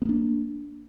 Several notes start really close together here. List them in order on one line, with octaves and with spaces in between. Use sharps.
B3 A#3 D4